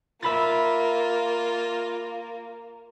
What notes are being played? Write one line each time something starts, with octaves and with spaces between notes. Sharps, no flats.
A#3 F4 E5 B5 A6